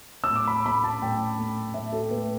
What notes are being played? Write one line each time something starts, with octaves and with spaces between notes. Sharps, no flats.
E6
A2
D6
B5
A3 B5
A5
A2 G5
A3
A2 E5
A4
A3 B4